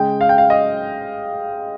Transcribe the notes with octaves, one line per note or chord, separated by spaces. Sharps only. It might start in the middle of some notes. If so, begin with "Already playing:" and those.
Already playing: C#3 G#3 G5
F5
G5
F5
D#5